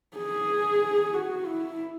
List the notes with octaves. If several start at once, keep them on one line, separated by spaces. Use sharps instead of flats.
G#4
F#4
E4